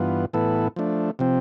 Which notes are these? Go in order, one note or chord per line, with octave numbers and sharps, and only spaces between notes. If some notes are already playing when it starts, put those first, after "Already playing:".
Already playing: G2 E3 B3 F4
A2 E3 B3 E4 A4
F3 A3 D4
C3 F3 C4